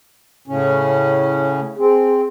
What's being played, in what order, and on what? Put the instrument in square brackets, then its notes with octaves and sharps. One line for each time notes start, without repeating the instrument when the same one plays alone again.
[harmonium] A2 C#3 C#4
[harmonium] C4 [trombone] G#4